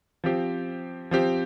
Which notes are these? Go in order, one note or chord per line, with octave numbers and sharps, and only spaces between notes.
F3 C4 G4
F3 C4 G4